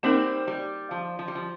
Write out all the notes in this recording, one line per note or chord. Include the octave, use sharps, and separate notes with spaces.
G3 A#3 C4 D#4 A#4
G3
F3
F3
G3
F3